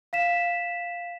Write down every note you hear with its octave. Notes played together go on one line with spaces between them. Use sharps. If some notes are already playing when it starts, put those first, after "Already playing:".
F5 B6 E7